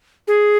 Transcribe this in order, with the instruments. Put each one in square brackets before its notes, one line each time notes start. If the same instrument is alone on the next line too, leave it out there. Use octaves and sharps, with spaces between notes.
[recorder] G#4